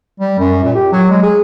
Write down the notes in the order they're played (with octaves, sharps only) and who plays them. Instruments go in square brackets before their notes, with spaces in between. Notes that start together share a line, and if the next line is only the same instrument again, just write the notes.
[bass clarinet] G3
F#2
A#2
G4
F#3
G#3
G#4